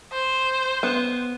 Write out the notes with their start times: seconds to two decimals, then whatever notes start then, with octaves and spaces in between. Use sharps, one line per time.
0.12 C5
0.83 B3